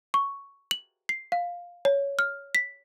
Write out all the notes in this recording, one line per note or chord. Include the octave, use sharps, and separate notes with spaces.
C#6
F#7
C7
F5
C#5
F6
B6